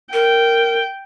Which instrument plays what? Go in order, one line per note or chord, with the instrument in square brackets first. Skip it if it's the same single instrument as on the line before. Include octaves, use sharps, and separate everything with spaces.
[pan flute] A#4 [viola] G5